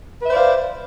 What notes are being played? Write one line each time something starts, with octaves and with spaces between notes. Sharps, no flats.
B4 C5 D5 E5 F5